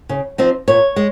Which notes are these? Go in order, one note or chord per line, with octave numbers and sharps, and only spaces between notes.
C#3
F3 C4 D#4
A#2 C#5
G#3